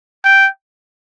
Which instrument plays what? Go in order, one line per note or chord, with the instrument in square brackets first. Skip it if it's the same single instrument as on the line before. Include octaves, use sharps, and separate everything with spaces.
[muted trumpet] G5